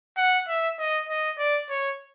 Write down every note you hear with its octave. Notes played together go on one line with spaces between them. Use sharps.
F#5
E5
D#5
D#5
D5
C#5